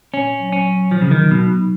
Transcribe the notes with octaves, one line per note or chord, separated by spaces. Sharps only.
A#2 C#4
F#3
C#4
F#3
A#2 F3
C#3
D#3
F#3
B2
D#4